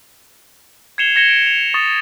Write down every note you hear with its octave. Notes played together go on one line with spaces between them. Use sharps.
G#6 C7 C#7 E7 F7 G7
G#6 A#6 C#7 E7 G7
D7
F7
C#6 D#6 A6